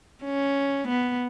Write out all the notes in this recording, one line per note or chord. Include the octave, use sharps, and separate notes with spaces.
C#4
B3